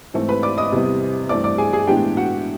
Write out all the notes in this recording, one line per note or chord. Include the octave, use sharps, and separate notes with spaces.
G#2 E3 A3 C4
B4 B5
D5 D6
D#5 D#6
E2 C3 E3 G3 B3
G2 E3 A3 C4 D5 D6
D5 D6
G#4 G#5
G#4 G#5
A2 E3 G#3 B3 D4 G4 G5
F#4 F#5